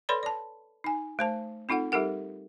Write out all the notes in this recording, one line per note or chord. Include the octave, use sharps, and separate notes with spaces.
A4 B4 C#5 D5 B5 C6
D5 A5
D#4 G#5
A3 C5 A5
C4 D#4 F4 A4 F#5
G3 D#4 G4 A4 A#4 F#5